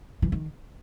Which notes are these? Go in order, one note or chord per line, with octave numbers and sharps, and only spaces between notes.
E3
D#3